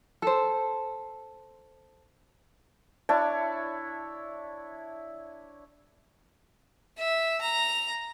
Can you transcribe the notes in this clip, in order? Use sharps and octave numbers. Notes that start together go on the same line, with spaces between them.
A4 C5
D4 E4 C#5 A5
E5
A#5